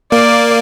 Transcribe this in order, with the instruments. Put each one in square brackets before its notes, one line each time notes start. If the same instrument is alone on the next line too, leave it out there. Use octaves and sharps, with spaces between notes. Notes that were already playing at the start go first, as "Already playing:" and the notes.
[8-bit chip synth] A#3 [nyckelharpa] D5